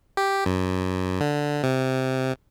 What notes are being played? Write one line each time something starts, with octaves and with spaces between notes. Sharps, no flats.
G4
F#2
D3
C3